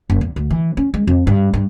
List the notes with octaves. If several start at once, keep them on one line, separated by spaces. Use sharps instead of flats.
F#1
E2
D2
E3
C#4
G#3
F2
G2
G2